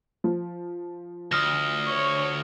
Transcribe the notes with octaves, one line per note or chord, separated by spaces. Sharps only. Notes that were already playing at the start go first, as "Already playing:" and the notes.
F3
D2 D#6 F6 A#6
C#5